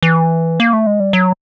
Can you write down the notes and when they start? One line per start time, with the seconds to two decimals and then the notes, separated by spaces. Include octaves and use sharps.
0.03 E3
0.60 A#3
0.73 A3
0.86 G#3
1.00 G3
1.13 F#3